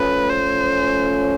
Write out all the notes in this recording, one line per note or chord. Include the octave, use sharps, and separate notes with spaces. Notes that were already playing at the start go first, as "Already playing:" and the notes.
Already playing: F3 A3 C#4 B4
C5